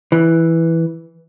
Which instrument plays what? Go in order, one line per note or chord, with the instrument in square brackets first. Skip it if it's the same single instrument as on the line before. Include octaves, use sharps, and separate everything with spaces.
[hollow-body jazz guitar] E3